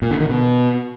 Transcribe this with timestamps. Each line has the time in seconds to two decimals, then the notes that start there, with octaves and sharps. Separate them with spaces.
0.02 A#2
0.11 D3
0.20 D#3
0.29 B2